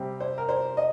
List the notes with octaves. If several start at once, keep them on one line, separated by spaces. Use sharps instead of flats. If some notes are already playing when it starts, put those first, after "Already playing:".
Already playing: C3 G3 C4 G4
C5
A#4
C5
D#5